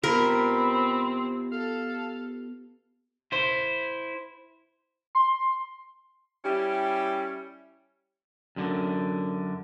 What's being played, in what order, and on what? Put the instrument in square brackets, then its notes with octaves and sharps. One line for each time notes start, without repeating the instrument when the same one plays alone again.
[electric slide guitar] B3 F4 G4 [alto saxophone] C4 [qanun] A#4 [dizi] B5
[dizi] A4 [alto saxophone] F5
[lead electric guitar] E4 C5
[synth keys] C6
[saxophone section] G3 C#4 E4 G4
[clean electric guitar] F#2 D3